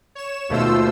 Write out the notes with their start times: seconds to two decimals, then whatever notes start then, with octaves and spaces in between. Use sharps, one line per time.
0.15 C#5 E7
0.49 D#2 B2 A3 F4 C5 E6